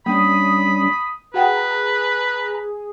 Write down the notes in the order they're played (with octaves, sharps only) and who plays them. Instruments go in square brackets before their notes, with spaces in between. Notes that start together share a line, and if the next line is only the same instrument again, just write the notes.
[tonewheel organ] G3 C#4 D4 [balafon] A#3 [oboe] B5 [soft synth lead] D#6
[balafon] F#4 F#5 G5 [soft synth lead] G#4 [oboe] B4 [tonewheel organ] A#5